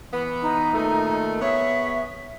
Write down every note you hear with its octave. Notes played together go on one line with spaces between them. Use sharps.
E3 B3
D#4
A#2 D#3 A3
B3 G#4 C#5 E5